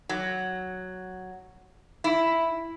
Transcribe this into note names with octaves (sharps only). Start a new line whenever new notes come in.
F#3
E4